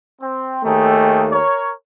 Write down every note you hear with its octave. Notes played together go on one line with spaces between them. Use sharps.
C4
D#2 A3 D#4 G#4 G5
A#4 C#5